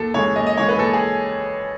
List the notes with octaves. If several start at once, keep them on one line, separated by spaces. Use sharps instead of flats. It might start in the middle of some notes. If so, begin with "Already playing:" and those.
Already playing: D#2 A4
C#3 E3 G#3 C#5
D#2 D#5
D#5
C#3 E3 G#3 C#5
B4
D#2 A4
G#4